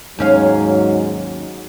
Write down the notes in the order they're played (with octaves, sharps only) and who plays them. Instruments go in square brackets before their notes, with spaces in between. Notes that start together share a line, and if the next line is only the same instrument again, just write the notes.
[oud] D#2 C#4 F5 [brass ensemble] G#2 F#3